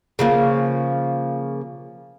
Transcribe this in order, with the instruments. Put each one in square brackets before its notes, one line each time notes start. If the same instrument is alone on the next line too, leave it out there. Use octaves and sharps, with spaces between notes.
[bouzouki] C#3 F3 A#3